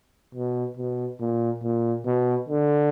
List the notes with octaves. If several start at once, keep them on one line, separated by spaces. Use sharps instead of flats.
B2
B2
A#2
A#2
B2
D3